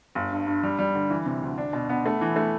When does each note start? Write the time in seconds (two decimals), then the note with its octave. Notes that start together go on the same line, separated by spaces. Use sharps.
0.15 G1
0.32 G2
0.47 G2
0.63 G3
0.79 G3
0.95 D3
1.10 E3
1.26 C3
1.42 D2
1.58 D4
1.73 B2
1.89 B3
2.06 A3
2.21 E3
2.36 A3